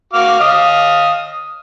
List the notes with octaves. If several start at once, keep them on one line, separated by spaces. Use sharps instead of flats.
F#4 F5 D6
D#5 F5 D#6